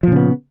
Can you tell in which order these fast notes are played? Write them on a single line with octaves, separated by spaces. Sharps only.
F3 A#2 C#3 B3